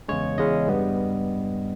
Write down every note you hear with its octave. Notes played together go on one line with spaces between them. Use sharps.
E2 C#3 G#3 C#4 C#5
E2 C#3 G#3 C#4 D#5
G2 G3 B3